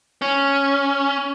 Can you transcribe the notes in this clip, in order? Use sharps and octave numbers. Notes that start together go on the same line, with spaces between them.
C#4